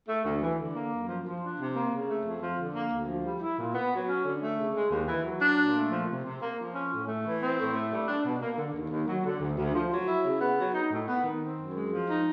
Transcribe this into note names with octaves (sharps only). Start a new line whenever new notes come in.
A3
D2
E3
D3
A#3
F#2
F3
F3
D4
C3
A#3
C#3
A3
F2
F3
D3
A#3
D2
F3
G3
E4
A#2
B3
F#3
C#4
D3
A3
C#3
G#3
D#2
E3
F#3
D4
A#2
A3
F3
C3
C3
A#3
F3
C#4
A2
A3
E3
C4
A2
A3
G3
D4
B2
A#3
D3
D#2
D#2
F#3
D3
D2
D2
F3
F#3
E4
C#3
B3
F#3
D#4
A2
B3
D#3
C4
F#2
G#3
F3
D#4